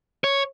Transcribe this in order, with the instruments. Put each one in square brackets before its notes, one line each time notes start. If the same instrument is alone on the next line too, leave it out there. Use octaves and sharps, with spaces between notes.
[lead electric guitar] C#5